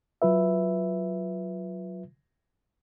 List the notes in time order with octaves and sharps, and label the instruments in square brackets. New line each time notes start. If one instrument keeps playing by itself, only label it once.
[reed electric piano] F#3 F4 B4 E5